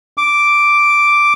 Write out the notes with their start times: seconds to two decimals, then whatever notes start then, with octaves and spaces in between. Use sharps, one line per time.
0.18 D6